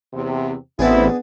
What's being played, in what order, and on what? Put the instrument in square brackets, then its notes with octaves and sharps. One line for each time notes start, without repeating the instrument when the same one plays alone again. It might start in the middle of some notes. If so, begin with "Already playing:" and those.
[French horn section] E2 C3
[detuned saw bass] A1 [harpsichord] B3 D4 G#4 [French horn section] C4 E4